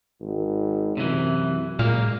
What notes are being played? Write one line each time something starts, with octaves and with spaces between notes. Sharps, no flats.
G#1
F#2 C3 E3
A#2 G#3 A#3 F5